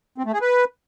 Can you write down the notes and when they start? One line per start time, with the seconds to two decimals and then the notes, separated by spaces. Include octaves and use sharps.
0.18 C4
0.26 A3
0.33 G#4
0.41 B4